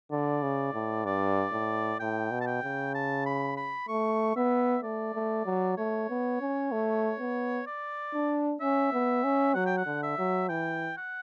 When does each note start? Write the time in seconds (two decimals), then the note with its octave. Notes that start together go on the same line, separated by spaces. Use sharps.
0.11 D3 D5
0.43 C#3
0.74 A2
1.05 G2 D5
1.53 A2
2.00 A2 G5
2.31 B2
2.41 A5
2.47 G5
2.63 C#3
2.95 A5
3.26 B5
3.57 B5
3.88 A3 C#6
4.36 B3 E5
4.83 A3 D5
5.15 A3
5.46 F#3
5.77 A3 C#5
6.10 B3
6.41 C#4
6.72 A3
7.20 B3
7.67 D5
8.14 D4
8.61 C#4 E5
8.93 B3
9.24 C#4
9.55 F#3 F#5
9.66 G5
9.77 F#5
9.86 D3
10.03 E5
10.18 F#3
10.49 E3 G5
10.97 F#5